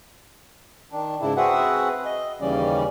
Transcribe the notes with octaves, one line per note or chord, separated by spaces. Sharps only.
D#3 D4
G#2 C#3 D4 E4
C4 F#4 G#4 B4 E5 F#5
D#5
D#2 C#3 E3 G3 C#4 D5